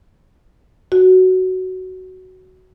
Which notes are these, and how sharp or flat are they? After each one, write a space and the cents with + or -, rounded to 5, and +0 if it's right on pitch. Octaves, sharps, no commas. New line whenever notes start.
F#4 +10